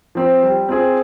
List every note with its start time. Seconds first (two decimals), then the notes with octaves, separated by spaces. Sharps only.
0.15 F3 C4
0.43 G3
0.69 C4 F4 G#4